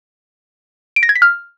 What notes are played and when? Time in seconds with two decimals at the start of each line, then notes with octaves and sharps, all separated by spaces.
0.96 D7
1.03 A#6
1.09 G#6
1.15 B6
1.22 F6